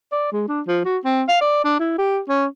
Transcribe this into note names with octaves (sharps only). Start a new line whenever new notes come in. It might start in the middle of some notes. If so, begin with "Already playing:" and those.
D5
G#3
D4
F3
F#4
C4
F5
D5
D4
E4
G4
C#4